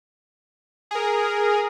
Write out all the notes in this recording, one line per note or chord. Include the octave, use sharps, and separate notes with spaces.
G#4 A#4